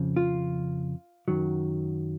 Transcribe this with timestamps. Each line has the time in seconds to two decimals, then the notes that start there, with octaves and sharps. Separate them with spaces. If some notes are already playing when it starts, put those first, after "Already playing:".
Already playing: F2 C#3 F3
0.16 F4
1.28 F#2 D#3 F#3